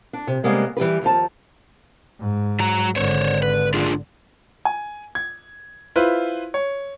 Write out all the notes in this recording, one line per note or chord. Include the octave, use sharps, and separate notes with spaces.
D4
C3
C3 G3 G#3 A#3 B3
E3 G3 G4 B4
D#2 F3 A5
G#2
F#3 A#5
G#1 D3 C5 C#5
B4
D4 F4 G#4
G#5
G#6
E4 F4 B4 C5
C#5